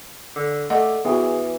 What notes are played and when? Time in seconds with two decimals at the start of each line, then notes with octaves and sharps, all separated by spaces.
0.36 D3
0.70 A3 D5 D#5 F#5
1.05 E3 B3 F#4 G#4